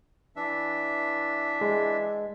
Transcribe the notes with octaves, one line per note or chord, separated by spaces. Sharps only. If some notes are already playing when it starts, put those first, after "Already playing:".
E3 D4 E5
G#3